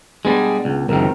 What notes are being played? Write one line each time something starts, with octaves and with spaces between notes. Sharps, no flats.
G3 G#3 B3 D4 G#4
C#2
C#2 F#2 D#3 C4 A#4